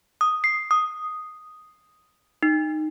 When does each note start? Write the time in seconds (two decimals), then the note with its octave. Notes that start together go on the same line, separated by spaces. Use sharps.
0.21 D#6
0.44 C7
0.71 D#6
2.43 D#4